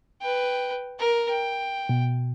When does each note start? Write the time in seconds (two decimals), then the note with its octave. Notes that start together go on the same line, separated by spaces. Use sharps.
0.21 B4 G5
0.99 A#4
1.30 G5
1.89 B2